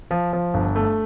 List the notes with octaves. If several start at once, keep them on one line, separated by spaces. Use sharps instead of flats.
F3
F3
G1
A3